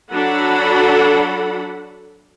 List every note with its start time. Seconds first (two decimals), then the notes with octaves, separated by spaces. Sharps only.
0.11 F#3 D4 F#4 A4 F#5 B5